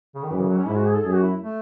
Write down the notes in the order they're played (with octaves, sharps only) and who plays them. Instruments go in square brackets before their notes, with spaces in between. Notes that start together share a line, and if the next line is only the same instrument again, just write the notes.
[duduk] C#3
D#3
[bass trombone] F#2 [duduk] E3
[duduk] C#3
F#3
C#4
[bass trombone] G#2 [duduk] E4
[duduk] F#4
G#4
A4
[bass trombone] F#2 [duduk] G#4
[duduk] F#4
E4
A3